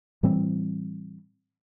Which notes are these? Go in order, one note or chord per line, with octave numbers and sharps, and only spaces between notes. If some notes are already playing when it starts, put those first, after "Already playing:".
A2 E3 G3 C4